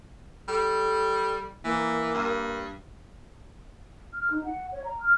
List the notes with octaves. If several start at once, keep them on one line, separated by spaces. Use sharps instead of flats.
G3 A4
E3 A#3
G2
F6
D#4
F#5
C#5
A#5
F6